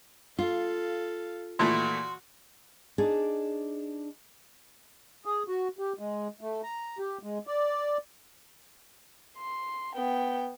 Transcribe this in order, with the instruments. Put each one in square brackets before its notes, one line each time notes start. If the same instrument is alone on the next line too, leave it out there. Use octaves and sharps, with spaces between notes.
[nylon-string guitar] F4 [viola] A4 F5
[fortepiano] A#2 E3 A3 [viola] F#4 [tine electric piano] C6
[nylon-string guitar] D4 D#4 G#4 D5
[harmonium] G#4
F#4
G4
G#3
A3
A#5
G4
G#3
D5
[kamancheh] C6
B3 G5